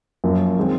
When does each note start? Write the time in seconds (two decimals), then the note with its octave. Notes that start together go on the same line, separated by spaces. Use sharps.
0.24 F#2 F3 A#3
0.58 D#3 G#3 C4